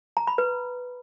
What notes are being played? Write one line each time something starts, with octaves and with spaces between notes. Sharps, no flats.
A#5
B5
B4